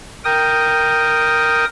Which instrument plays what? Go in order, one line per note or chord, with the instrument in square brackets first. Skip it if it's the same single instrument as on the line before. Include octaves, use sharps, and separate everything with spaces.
[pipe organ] A#4 G5 D#6